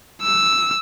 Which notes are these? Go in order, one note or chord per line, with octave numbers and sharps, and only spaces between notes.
E6